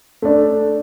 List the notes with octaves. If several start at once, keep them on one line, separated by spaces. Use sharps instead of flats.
A3 D4